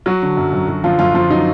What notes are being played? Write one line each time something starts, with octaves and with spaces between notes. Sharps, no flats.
F#3 F#4
D3
F#2
F#2
F#3
D3 F3 F4
F#2 F3 F4
F#2 F3 F4
F#3 D#4